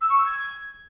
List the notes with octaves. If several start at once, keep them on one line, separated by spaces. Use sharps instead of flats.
E6
C#6
E6
G#6